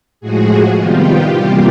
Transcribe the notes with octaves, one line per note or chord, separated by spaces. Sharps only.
A2 F3 G#3 F#4 G#4
C3 D#3 G3 B3 F4 G4
C3 E3 G3 A#3